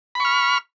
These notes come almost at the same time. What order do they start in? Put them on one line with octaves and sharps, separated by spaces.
B5 C#6 F6